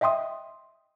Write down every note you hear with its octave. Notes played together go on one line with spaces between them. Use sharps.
D#5 E5 G5 C6 D#6